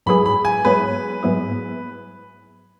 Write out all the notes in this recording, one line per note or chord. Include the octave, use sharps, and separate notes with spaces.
G#2 F#3 B3 E4 G#4 B5
B5
G#5
G#2 F#3 B3 E4 G#4 B4
G#2 F#3 B3 E4 G#4